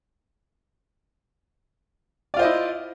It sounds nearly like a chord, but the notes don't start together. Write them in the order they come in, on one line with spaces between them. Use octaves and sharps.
D5 F4 C5 D#5 E4